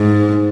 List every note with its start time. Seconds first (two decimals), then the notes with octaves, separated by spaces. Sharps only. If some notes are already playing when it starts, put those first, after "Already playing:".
Already playing: G#2